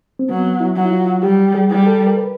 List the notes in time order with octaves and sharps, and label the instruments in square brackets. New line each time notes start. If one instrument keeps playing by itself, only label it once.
[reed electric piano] C4
[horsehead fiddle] F#3 [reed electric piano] B3
[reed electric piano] E4
[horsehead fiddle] F#3
[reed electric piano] E4
F4
[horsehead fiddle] G3 [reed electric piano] G4
[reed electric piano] G#4
[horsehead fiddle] G3
[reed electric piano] A4
A#4
B4